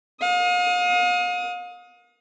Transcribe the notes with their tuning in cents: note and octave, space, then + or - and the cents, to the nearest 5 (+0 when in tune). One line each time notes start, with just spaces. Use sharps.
F5 +40 D#6 +20